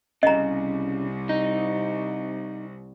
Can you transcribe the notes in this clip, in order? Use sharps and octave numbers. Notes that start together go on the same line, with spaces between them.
C2 C#3 D#5 A#5
D#4